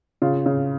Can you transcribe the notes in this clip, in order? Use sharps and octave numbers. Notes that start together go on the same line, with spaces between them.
C#3 F4
C#3